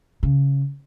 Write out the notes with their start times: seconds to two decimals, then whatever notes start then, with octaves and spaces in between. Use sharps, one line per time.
0.23 C#3